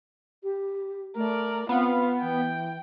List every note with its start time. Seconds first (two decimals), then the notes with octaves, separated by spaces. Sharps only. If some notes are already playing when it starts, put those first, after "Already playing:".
0.43 G4
1.16 A3 A#4 D5
1.69 B3 C4 F4 F5
2.22 E3 G5